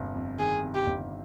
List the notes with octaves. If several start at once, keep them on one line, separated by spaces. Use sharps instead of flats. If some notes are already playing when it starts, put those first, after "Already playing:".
Already playing: G1 C3
F2
D#3 G#4
C3
G4
G1